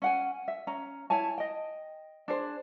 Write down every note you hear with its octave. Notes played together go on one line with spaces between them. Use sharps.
C#4 F#5 G#5
E5
C#4 A#5
E4 C#5 G#5 A5
D#5 G5
D4 G#4 C5